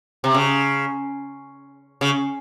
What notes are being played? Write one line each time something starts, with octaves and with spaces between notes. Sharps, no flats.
C3
C#3
C#3